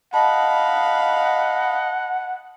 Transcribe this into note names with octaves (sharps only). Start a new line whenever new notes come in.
D#5 F5 F#5 A5 B5